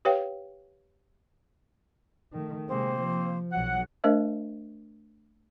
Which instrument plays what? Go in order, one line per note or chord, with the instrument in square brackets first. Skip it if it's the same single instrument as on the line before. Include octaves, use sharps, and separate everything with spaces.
[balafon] G4 B4 C#5 F5 G5
[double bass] D#3 A3
[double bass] C3 G#3 [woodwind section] A#3 C4 C5
[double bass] F3
[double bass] B1 F#3 [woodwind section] F#5
[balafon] A3 D4 A#4 C5 D#5 E5